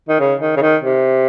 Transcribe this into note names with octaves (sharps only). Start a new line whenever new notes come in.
D#3
C#3
D#3
C#3
D#3
C3